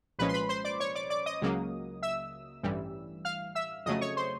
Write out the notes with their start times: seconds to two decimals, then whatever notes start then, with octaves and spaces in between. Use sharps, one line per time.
0.18 C2 A#2 F3 G#3 C#4 B4 B5
0.29 C6
0.34 B4 B5
0.49 C5 C6
0.65 D5 D6
0.80 C#5 C#6
0.95 D5 D6
1.10 D5 D6
1.26 D#5 D#6
1.41 C#2 C#3 F#3 A#3
2.02 E5 E6
2.63 A1 G2 E3 G3
3.25 F5 F6
3.55 E5 E6
3.86 F2 C#3 F#3 A3 D#5 D#6
4.01 C#5 C#6
4.17 C5 C6